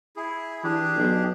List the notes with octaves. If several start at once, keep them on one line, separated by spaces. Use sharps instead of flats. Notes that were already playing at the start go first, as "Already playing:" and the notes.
E4 G#4
E3 D4 G4 G#4
B1